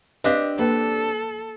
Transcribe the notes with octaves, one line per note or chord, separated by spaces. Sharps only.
C4 D4 G4 B4 D#5 F5
A#3 A4 B4